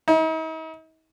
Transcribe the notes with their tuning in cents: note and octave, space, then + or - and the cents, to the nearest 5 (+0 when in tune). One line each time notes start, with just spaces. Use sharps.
D#4 +45